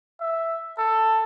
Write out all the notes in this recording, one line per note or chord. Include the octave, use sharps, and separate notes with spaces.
E5
A4